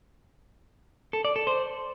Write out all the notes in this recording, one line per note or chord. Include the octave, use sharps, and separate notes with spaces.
A4
D5
A4
C5